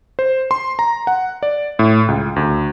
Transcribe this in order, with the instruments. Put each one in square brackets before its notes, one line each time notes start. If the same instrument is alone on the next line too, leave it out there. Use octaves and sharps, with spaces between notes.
[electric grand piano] C5
C6
A#5
F#5
D5
A2
C#2
D2